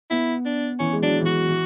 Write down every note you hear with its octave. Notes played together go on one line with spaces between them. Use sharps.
B3 E4
D4
E3 C#4
G#3
F#3 D4
E3
F#3 F#4
E3